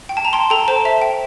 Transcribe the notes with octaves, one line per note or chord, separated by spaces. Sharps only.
G5
A5
A#5
G5 A5 C6
A4 G5 A#5
C5 A5
E5
G5